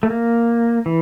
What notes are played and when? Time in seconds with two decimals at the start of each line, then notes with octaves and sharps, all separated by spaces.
0.03 A3
0.10 A#3
0.86 E3